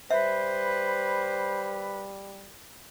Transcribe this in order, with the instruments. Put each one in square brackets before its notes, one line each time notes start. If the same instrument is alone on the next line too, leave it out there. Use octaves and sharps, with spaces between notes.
[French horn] G3 [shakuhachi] B4 [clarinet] C5 [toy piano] E5